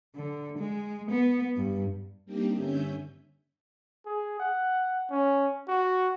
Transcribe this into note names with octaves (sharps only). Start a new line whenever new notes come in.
D3
G#3
B3
G2
G3 A#3 C4 D4 D#4 G4
G2 D3 C#4 E5 G#5 G6
G#4
F#5
C#4
F#4